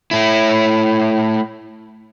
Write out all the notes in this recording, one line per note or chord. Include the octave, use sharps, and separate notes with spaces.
A3 E4